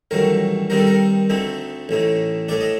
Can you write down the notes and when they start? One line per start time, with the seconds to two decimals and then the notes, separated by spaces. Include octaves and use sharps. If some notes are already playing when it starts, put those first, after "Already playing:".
0.11 A1 G2 D#3 F#3 A3 A#4
0.70 G2 D#3 G3 C4 D#4 A#4
0.79 A4
0.87 A#4
1.30 D2 D3 A3 C4 D#4
1.89 A1 A2 A3 D#4
2.48 A2 A3 D4 D5
2.61 D#5